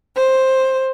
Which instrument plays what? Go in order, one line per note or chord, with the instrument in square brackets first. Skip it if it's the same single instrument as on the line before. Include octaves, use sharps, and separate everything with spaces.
[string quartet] C5